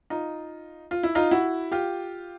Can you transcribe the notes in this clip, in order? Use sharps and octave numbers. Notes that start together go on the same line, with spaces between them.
D#4 F4
F4
E4
D#4 F4
E4 F#4
F4 G4